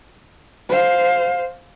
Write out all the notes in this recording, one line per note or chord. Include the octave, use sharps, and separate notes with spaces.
C5 F5